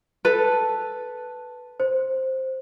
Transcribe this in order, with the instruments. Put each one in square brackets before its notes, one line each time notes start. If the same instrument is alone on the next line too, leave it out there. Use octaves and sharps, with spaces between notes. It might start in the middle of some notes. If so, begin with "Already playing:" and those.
[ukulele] A4 B4
[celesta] C5